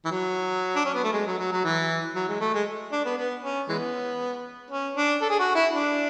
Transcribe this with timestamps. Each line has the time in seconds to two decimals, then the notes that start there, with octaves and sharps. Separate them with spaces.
0.05 E3
0.11 F#3
0.76 D4
0.85 C#4
0.94 B3
1.04 A3
1.13 G#3
1.26 F#3
1.39 F#3
1.52 F#3
1.64 E3
2.15 F#3
2.28 G#3
2.40 A3
2.54 G#3
2.92 D4
3.05 B3
3.18 B3
3.43 C#4
3.69 E3 G#3 B3
4.71 C#4
4.96 D4
5.21 A4
5.30 G#4
5.39 F#4
5.55 E4
5.73 D4